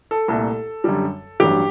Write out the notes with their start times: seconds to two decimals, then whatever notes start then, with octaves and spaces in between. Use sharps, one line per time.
0.11 A4
0.28 C2 A#2 A3 A4
0.84 F#2 D3 G3
1.40 A1 G2 F#3 G4